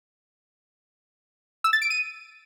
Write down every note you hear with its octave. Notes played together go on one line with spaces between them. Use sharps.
E6
A6
D7
D#7